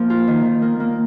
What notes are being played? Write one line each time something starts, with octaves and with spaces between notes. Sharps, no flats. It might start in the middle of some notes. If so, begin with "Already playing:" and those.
Already playing: F3 A#3
F4
D#3
D#3
A#3
A#3